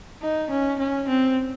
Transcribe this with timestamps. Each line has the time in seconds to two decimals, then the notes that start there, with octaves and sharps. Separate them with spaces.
0.22 D#4
0.50 C#4
0.79 C#4
1.08 C4